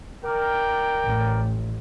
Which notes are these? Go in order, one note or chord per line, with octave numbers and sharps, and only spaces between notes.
A#4 D5 G5
A1